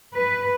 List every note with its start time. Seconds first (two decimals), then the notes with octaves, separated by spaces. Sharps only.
0.15 B4